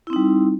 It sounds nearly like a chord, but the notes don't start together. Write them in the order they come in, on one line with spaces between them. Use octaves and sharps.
E4 C4 D#4 G3